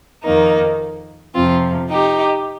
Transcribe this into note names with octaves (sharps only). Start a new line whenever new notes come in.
F2 D#3 A#3 D#4
F2 C3 F3 C4 F4
D#4 G4